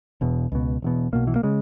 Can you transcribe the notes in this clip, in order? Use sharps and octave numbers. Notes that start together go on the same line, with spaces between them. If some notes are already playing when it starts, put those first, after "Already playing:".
E1 E2 B2
C#2 B2
E1 E2 B2
B1 B2 A#3
E3
A#3
C#3 G#3